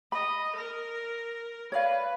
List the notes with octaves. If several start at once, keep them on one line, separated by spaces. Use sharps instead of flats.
D#5 B5
A#4
B4 C#5 D5 F5